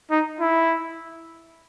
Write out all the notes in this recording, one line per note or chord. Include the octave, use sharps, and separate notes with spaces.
D#4
E4